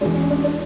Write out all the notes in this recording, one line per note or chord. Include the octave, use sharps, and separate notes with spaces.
E2 B2 G#3 D4
C#4
D4
D4